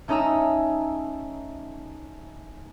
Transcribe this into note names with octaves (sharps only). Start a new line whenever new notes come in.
A3 C#4 D#4 G#4 A#5 E6